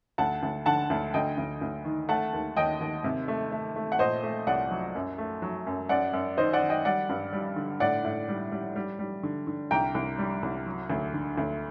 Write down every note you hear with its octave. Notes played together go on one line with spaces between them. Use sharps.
D2 F#5 A5
D2
D3 F#5 A5
D2
D2 D#5 G5
D2
D2
D#3
A3 F#5 A5
D#2
D#2 D#5 G5
D#2
C3
A3
A3
A3
F#5
A#2 C5 D#5
A3
C2 D5 F#5
F#3
F#2
A3
F#3
F#2
F#2 D5 F#5
F#2
D#3 C5 D#5
D5 F#5
D#3
D#5 G5
G3 D5 F#5
G2
G3
D3
A2 D5 F#5
A2
G3
G3
G3
G3
D3
D3
C2 G5 A#5
C2
G3
C2
F#3
D2
D3
D2